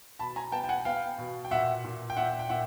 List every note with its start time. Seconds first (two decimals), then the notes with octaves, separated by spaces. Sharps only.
0.19 B2 A5 B5
0.36 G#5 A#5
0.52 B3 G5 A5
0.64 G5
0.69 F#5 G#5
0.85 B3 F5 G5
1.18 B2
1.45 G5
1.51 A#2 E5 F#5
1.84 A#2
2.10 G5
2.17 A#2 E5 F#5
2.39 G5
2.49 A#2 E5 F#5